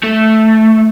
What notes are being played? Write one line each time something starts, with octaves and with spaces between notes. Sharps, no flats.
A3